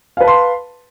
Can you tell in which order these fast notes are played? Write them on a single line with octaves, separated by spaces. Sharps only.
F5 B4 A5 C6